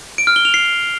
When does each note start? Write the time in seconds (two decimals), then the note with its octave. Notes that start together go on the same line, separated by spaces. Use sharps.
0.18 D7
0.27 F6
0.36 G7
0.45 F7
0.54 C7